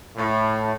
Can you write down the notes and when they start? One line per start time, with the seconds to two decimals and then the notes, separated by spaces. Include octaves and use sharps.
0.17 A2